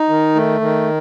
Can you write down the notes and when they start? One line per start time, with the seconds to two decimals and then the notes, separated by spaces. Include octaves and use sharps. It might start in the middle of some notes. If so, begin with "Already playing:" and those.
Already playing: D#4
0.09 D#3
0.35 A3
0.61 D#3